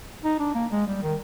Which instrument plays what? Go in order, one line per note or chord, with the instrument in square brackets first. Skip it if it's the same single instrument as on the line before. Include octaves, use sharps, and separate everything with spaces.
[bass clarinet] D#4
D4
A#3
G#3
G3
D#3